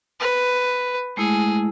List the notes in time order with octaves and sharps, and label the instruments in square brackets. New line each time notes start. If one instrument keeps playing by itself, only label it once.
[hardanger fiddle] B4
[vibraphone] G#3 A3 E4 [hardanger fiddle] G#4